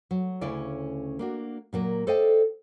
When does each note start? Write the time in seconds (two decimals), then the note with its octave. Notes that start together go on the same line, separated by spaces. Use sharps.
0.11 F#3
0.41 D2 C#3 C#4 E4 D5 F5
1.19 A#3 D4 F#4
1.73 A#2 F#3 A#3
2.07 A4 C5 D5 D#5 F5 G5